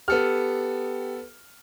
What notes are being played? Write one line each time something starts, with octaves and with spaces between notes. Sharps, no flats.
B3 G4 A4 F6